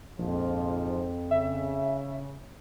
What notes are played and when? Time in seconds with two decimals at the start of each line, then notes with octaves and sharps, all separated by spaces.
0.19 A#1 F2 G#2 F3
1.31 C#3 E5